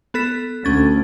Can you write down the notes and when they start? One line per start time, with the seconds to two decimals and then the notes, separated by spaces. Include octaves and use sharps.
0.14 B3 A4 B6
0.65 D2 C#4 A6